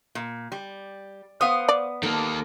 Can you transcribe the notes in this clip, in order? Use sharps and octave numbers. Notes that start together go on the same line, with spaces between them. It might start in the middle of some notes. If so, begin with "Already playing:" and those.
A#2
G3
B3 C5 F5 D#6
D5
D#3 A#3 A4